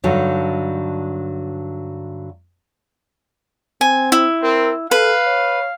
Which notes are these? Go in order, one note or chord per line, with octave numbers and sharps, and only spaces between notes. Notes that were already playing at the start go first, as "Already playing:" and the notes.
G2 D3 F#3 D#4
C4 G#5
E4
C4 A#4
A4 B4 F5
C#5